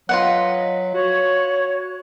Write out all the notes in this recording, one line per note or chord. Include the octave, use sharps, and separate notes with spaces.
F#3 F4 B4 D#5 F#5
F#4 C#5